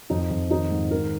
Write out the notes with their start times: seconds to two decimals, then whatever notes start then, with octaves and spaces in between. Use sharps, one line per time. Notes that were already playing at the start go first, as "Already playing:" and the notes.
0.10 F2 D#4
0.31 F2
0.51 D#3 D#4
0.71 G#2
0.91 D#3 A#4